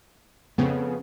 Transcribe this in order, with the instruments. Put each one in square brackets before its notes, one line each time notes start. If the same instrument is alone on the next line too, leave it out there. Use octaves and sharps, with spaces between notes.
[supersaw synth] F2 C#3 [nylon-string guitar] B3